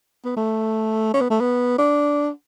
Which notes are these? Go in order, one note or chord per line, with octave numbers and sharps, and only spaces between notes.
B3
A3
C#4
B3
A3
B3
D4